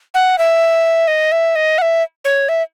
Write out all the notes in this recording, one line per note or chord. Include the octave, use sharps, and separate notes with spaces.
F#5
E5
D#5
E5
D#5
F#5
E5
C#5
E5